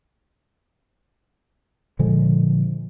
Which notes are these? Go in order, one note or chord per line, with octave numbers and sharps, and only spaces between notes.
A#2 D3 F3 G#3